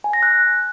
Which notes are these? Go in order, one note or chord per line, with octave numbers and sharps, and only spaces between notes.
G#5
A#6
F#6